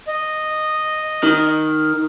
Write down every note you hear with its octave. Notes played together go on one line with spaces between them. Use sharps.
D#5
D#3